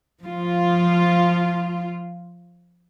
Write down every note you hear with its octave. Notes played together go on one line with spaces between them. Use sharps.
F3 F4